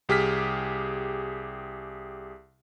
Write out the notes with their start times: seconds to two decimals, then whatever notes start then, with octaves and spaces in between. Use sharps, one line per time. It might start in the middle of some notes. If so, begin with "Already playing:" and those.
0.09 C2 G4 G#4 F6 B6